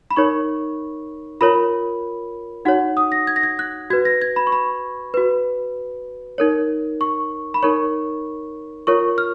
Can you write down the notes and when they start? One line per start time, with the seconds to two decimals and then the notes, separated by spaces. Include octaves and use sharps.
0.11 B5
0.16 D#4 A#4 C#5 C#6
1.41 F4 A#4 C#5 B5
2.65 D#4 F#4 C#5 F#5
2.97 D#6
3.12 A#6
3.27 G#6
3.36 A#6
3.43 G#6
3.59 F#6
3.90 F#4 G#6
3.93 B4
4.05 A#6
4.22 G#6
4.36 B5
4.47 C#6
4.52 B5
5.14 F#4 B4
6.38 D#4 A#4 C#5
7.01 C#6
7.54 B5
7.63 D#4 A#4 C#5 C#6
8.87 F4 A#4 C#5 C#6
9.18 F6